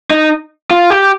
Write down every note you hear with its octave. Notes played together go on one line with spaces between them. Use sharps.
D#4
F4
G4